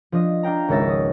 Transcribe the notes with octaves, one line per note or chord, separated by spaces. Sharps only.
F3 D4 D#5
D4 F5 G5 A#5
G#1 C#2 C#5 E5 A6 A#6
D#6